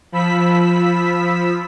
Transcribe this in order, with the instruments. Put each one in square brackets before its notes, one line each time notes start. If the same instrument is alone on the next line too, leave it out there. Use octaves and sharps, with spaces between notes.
[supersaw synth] F3 B5 E6 B6